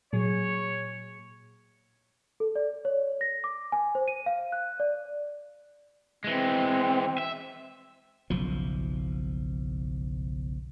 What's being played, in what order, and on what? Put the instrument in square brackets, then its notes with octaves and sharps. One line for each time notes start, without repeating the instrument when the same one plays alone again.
[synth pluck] A#2 F#3 G#4 [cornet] C#5
[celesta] A4
D5
C#5
A#6
D6
G#5
C5
D#7
F5
F#6
D5
[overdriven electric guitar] E3 G#3 [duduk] C4
[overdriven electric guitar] E5
[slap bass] F#1 B1 F3